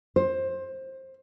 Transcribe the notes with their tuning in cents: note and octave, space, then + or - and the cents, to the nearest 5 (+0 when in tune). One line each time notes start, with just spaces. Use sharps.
C5 +20